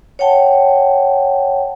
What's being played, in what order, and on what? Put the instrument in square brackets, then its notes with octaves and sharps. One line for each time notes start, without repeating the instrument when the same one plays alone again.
[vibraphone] C#5 F#5 G5 A5